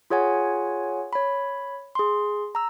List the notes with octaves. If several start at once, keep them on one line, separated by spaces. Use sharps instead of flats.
F4 G#4 C#5 F#5 G#5
C#5 B5
G#4 C6
A#5 E6